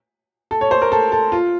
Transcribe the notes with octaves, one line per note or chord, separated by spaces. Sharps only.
A4
C#5
C5
A#4
A4
A4
F4